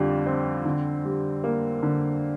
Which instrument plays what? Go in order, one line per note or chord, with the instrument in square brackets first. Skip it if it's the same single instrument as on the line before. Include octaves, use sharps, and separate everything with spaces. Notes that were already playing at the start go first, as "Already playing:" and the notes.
Already playing: [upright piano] F2 D3 G3
C4
D3
G3
A#3
D3